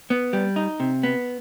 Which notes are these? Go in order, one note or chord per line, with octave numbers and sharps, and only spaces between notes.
B3
G3
D#4
C3
B3